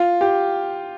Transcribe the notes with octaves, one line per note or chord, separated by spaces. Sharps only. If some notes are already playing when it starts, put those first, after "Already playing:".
Already playing: F4
G4